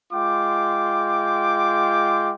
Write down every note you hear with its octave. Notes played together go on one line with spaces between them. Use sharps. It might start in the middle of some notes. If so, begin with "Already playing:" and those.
G#3 F4 G5 D6